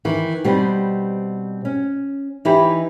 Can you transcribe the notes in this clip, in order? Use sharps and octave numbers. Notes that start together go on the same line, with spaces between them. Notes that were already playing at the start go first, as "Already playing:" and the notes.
D#3 E3
B2 G3 C4 D#4 G4 B4
C#4
E3 D#4 E4 G4 B4